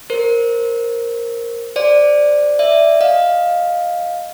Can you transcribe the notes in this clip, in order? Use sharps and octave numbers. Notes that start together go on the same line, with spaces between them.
A#4 C5
C5 D5
D5 E5
D#5 F5